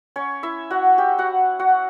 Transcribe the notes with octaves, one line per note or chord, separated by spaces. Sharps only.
C#4 C#5
E4 E5
F#4 F#5
G4 G5
F#4 F#5
F#4 F#5